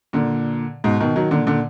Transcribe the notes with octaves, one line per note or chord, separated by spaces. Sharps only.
A#2 D3
G#2 B2
B2 D#3
D#3 F#3
A#2 D3
A#2 D3